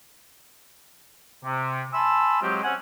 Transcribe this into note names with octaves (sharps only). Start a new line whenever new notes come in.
C3
G#5 A5 B5 C6 E6
F#3 G#3 C4 F4 G4
C4 C#4 F#5 G#5